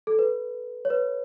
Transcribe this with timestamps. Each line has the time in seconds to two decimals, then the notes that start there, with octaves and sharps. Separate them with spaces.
0.07 A4
0.19 B4
0.85 C#5
0.90 B4